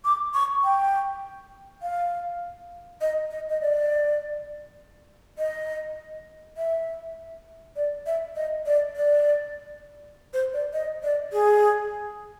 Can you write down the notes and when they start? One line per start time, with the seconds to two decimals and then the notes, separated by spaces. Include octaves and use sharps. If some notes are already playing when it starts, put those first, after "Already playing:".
0.05 D6
0.34 C#6
0.64 G5
1.82 F5
3.01 D#5
3.31 D#5
3.49 D#5
3.61 D5
5.38 D#5
6.57 E5
7.76 D5
8.06 E5
8.36 D#5
8.66 D5
8.95 D5
10.33 C5
10.53 D5
10.73 D#5
11.03 D5
11.33 G#4